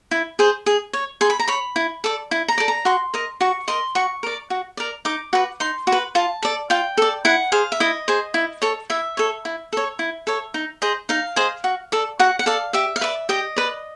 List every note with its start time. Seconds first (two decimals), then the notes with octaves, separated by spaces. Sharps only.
0.11 E4
0.39 G#4 C5
0.66 G#4
0.93 C#5
1.21 G#4 C6
1.30 B5
1.39 A#5
1.48 C#5 B5
1.76 E4
2.04 A4 D5
2.31 E4
2.48 A#5
2.58 A4 D5
2.68 A#5
2.85 F#4 C6
3.14 A#4 D#5
3.41 F#4 C#6
3.68 A#4 D#5 C6
3.95 F#4 C#6
4.23 A#4 D5
4.50 F#4
4.77 A#4 D5
5.05 D#4 D6
5.33 F#4 B4
5.60 D#4 C6
5.87 F#4
5.92 B4
6.15 F4 A5
6.43 A4 D5
6.70 F4 G5
6.97 A4 D5
7.25 E4 F#5
7.52 G#4 C5 F5
7.72 E5
7.80 E4 D#5
8.08 G#4 C5
8.34 E4
8.62 A4 C#5
8.90 E4 E5
9.17 A4 C#5
9.45 E4
9.73 A4 C#5
9.99 E4
10.27 A4 C#5
10.54 D#4
10.82 G#4 C5 D#5
11.09 D#4 F5
11.36 G#4 C5 D#5
11.64 F#4
11.92 A4 D5
12.19 F#4 F#5
12.39 F#5
12.46 A4 D5 F5
12.73 G4 E5
12.96 F5
13.01 B4 D5 E5
13.29 G4 D#5
13.56 B4 D5